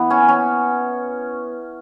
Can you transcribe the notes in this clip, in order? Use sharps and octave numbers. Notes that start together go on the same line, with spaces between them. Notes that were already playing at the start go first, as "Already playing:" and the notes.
Already playing: E3 B3
C#4
C#4